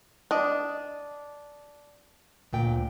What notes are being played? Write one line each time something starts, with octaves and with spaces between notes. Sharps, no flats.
D4 D#5
D2 A#2 G5